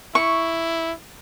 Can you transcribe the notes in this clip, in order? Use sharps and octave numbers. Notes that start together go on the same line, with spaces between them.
E4 C#6